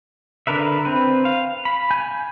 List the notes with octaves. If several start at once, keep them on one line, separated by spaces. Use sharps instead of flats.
D3 D4 A#4 B4 E5
C4 B4
F5
B5
G#5 G6